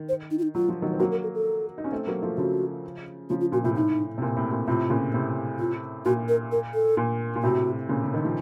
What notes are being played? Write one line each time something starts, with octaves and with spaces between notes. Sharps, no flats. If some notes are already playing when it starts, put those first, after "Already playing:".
Already playing: D#3
C5
D#4
F4
D#4
F#3 F4
F3
D#3 F#3
C4
F#3 A#3 F#4
A#4
A4
A4
D#4
C#4
A3 C4
F#3 A#3
F3 A3
C#3 F3 F#4
C#3 F3 F4
F4
A#2 F#4
A2 C3 F4
A2 D#4
C3
A#2
A2 C3
A#2
A2 C3 F4
A#2 C#3
A2 C3
F4
A#2 F#4
A#4
A#4
A4
A#2
A#2
A2 C3 F#4
A#2 C#3
C#3
D#3
F3